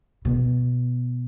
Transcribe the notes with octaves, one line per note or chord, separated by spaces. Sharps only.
B2